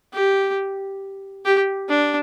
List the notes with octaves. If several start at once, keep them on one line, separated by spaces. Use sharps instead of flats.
G4
G4
D4